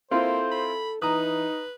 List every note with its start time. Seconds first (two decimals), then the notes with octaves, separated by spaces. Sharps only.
0.11 A#3 C4 E4 F4 A4 C5
0.52 B5
1.02 E3 D#4 B4 A#5 D#6